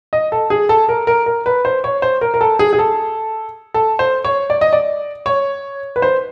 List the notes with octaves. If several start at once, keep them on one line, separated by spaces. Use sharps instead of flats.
D#5
A4
G#4
A4
A#4
A#4
A#4
B4
C5
C#5
C5
A#4
A#4
A4
G#4
G#4
A4
A4
C5
C#5
D5
D#5
D5
C#5
B4
C5